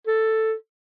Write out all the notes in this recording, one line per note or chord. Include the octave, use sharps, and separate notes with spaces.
A4